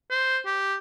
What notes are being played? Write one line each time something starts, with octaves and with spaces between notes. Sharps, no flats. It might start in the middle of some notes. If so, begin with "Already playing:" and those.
C5
G4